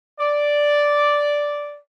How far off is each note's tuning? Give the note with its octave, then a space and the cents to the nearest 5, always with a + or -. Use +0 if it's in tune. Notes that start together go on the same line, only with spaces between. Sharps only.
D5 -5